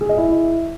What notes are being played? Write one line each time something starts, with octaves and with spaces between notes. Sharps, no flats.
G#4
D#5
E4